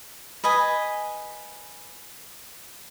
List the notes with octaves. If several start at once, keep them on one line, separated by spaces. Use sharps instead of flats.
B4 D#5 G#5